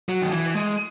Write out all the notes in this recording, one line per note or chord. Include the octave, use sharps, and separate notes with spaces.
F#3
D#3
E3
G#3